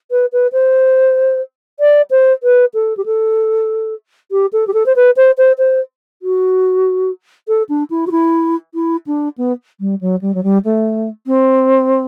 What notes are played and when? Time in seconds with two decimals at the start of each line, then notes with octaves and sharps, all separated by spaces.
0.11 B4
0.33 B4
0.53 C5
1.80 D5
2.11 C5
2.43 B4
2.74 A4
2.97 G4
3.06 A4
4.32 G4
4.53 A4
4.67 G4
4.74 A4
4.86 C5
4.96 B4
5.17 C5
5.38 C5
5.58 C5
6.22 F#4
7.48 A4
7.69 D4
7.90 E4
8.07 F#4
8.11 E4
8.74 E4
9.07 D4
9.38 B3
9.80 G3
10.01 F#3
10.21 G3
10.34 F#3
10.43 G3
10.65 A3
11.27 C4